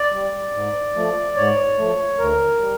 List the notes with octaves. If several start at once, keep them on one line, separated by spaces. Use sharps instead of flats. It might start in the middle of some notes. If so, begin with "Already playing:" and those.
Already playing: D5
G3
G#2
F3 A3
G#2 C#5
F3 A3
D2 A#4
G3